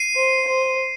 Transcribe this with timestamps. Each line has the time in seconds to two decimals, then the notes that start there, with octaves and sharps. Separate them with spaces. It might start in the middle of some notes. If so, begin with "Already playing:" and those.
Already playing: C7 D#7
0.16 C5
0.48 C5